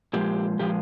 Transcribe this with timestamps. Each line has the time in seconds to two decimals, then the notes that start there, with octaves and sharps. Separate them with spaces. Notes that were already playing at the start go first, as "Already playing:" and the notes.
0.13 A#2 F3 G#3 G4
0.59 A#2 F3 G#3 G4